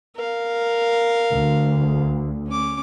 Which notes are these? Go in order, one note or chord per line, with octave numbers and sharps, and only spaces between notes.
A#4 F5
D2
C#4 D6